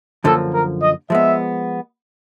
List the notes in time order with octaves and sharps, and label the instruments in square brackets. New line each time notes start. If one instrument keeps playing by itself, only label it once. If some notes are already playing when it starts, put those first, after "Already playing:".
[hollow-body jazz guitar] F#2 D3 F3 A#3 [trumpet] A4
[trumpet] A#4
D#5
[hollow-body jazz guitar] F3 G#3 B3 [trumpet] E5